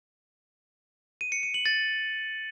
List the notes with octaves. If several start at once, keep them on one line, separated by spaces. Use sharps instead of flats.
D#7
C#7
D#7
F#7
A6